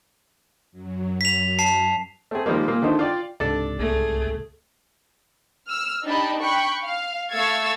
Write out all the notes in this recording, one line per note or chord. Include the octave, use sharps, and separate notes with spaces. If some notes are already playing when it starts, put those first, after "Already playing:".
F#2 F#3
B6 F7
A5 C7
A3 C4 G#4
D#3 F3 G3 G#3 A#3
A#2 A#3 F4
D3 D#3 A3 D#4 C5
F4 D5 G5
C#2 G#2 C3 D4 A4 D5
C2 A3 G#4
E6 F6
D4 D#4 G4 D#5 A5 B5
G5 B5 C#6 F#6
F5
A3 F5 C#6 E6 G#6 A6